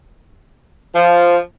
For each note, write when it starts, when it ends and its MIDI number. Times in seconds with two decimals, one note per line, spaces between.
0.94 1.38 53